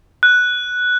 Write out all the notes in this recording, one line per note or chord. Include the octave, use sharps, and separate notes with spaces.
F#6